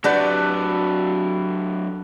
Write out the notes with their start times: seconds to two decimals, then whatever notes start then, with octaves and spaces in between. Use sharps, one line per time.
0.04 F#3 D4 F#4 G4 A4 B4 D5